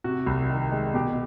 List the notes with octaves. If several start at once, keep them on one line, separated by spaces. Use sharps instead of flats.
C3 F#4
C2
D#3
G#3
B2 G4